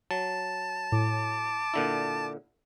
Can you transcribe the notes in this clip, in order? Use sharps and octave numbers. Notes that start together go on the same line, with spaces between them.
F#3 A5
A2 D6
A#2 D3 E4